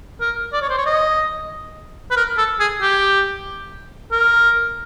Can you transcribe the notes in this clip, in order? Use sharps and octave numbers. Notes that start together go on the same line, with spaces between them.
A#4
D5
C#5
C5
C#5
D#5
B4
A#4
A4
G#4
G4
A#4